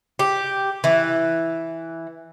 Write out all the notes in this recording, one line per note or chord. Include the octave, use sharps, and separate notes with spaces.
G4
E3